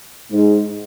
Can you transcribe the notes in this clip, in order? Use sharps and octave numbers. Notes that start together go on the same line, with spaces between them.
G#2